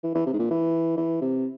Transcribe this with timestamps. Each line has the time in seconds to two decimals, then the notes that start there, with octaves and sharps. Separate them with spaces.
0.04 E3
0.15 E3
0.26 C3
0.33 G#2
0.39 A#2
0.51 E3
0.97 E3
1.21 C3